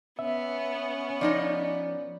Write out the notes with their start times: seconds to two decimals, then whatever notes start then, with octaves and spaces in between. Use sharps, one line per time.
0.19 B3 C#4 E5
1.21 F3 D#4 D5 D#5